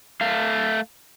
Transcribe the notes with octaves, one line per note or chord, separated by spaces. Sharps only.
A3 F5